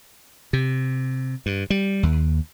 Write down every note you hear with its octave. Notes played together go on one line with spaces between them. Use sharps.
C3
G2
G3
D#2